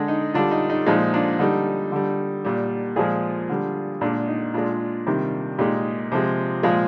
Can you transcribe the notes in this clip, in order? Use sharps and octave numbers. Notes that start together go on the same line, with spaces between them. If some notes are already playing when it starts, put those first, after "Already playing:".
Already playing: D3 G#3 D4
D#4
D3 G3 D4 F4
D#4
D#4
A#2 F3 G#3 D#4
D4 F4
D3 G3 D#4
D3 G3
A#2 G3
A#2 F3 G#3 F4 G#4
D3 G3
A#2 G#3 D4
D#4
A#2 G#3 D4 F4
C3 D#3 G3
A#2 G#3 D#4 G4
C3 F3 G#3
A#2 F3 G#3 F4 G#4